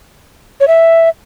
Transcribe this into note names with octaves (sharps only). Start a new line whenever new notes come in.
C#5
E5